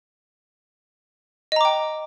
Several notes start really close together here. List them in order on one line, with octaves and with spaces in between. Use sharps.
D#5 A#5 D6 G5